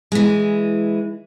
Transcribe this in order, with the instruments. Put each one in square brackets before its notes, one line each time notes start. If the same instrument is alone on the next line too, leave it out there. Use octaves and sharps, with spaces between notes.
[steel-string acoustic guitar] E3 G#3